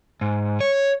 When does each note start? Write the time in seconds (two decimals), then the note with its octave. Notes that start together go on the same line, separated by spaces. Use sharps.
0.21 G#2
0.61 C#5